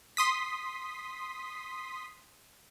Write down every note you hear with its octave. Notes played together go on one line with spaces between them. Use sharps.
C6 D#6 B6